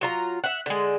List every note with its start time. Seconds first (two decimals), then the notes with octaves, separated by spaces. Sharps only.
0.01 F#3 F4 A#5
0.44 E5 F#5
0.66 D3 G#3